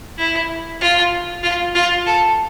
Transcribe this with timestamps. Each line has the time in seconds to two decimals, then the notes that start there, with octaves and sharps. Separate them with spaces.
0.18 E4
0.81 F4
1.43 F4
1.75 F4
2.06 A4